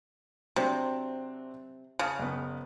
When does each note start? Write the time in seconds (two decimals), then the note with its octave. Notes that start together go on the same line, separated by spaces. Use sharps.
0.56 C3 F#3 C4 D4
1.99 C#3 A5 F6
2.19 F#1 B3